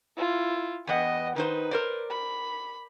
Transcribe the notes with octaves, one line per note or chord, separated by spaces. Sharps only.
E4 F4
E2 B3 D#5 F#5 G5
D#3 D#4 B4 C5
A#4 C5 D5
B5